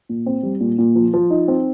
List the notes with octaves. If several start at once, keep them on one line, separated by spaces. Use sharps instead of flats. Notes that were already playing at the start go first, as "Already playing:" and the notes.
A#2
C4
G3
A#2
A#2
F3
F3
D#4
C4